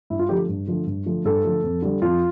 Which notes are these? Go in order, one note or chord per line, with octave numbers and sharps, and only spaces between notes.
G2 E4
F4
D3 F3 A3 G4
G2
D3 F3 A3
G2
D3 F3 A3
G2 A4
D3 F3 A3
F2
D3 G3
F2 F4